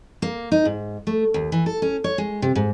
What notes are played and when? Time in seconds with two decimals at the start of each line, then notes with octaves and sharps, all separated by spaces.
0.22 A#3
0.52 D#4
0.65 G#2
1.07 A3
1.34 D#2
1.52 E3
1.66 A4
1.82 C#4
2.04 C#5
2.18 G#3
2.42 C3
2.55 G#2